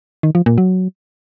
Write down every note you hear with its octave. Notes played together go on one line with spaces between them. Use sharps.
D#3
F3
A#2
F#3